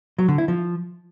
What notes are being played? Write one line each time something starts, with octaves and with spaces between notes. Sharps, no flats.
F#3
D3
E4
F3